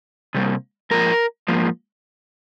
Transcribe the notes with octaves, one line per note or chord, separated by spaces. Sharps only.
C3 G3 A#3
G#2 F3 A#3 A#4
G#2 F3 A#3